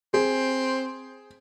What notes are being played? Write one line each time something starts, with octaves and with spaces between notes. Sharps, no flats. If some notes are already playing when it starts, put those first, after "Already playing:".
C4 G#4